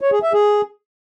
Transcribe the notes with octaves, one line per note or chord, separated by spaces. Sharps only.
C#5
G#4
E5
G#4